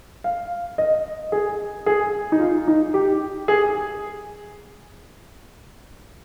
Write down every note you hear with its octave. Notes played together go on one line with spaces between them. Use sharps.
F5
D#5
G#4
G#4
D#4
F4
D#4
G4
G#4